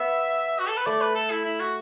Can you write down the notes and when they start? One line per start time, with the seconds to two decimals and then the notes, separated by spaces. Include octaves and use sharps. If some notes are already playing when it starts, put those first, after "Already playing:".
Already playing: B3 E5
0.59 F#4
0.68 A4
0.77 B4
0.86 A3 D5
1.01 B4
1.15 A4
1.31 E4
1.45 E4
1.60 F#4